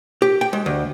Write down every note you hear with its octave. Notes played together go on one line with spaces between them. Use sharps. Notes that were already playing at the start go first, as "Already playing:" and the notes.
G4
G5
G#3
D2